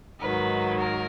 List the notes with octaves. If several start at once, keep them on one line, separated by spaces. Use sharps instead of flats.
G#2 D#3 F#3 B4
A#4